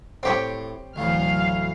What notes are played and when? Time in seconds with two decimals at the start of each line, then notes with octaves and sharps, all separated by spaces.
0.23 A2 C4 G4 C#5
0.96 D2 A2 E3 F#3 F5